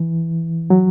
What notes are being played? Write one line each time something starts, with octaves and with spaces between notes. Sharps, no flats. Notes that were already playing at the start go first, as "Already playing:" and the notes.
Already playing: E3
F#3